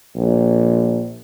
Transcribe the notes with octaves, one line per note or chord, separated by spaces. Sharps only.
A#1